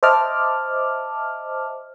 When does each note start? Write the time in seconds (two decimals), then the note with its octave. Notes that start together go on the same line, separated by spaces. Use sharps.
0.03 C5 D#5 E5 A5 D6 F6